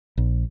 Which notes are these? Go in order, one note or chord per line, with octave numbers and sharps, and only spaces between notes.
A#1